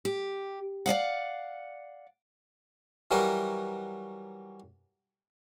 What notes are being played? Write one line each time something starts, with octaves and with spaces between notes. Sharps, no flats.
G4
D5 D#5 F5 F#5
E3 F#3 G3 E4 A#4 B4